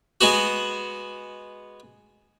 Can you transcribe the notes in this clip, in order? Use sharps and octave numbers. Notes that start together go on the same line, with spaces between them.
G#3 B3 F#4